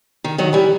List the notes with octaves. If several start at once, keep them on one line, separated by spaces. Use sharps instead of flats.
D#3
D#3 F#3
E3 G3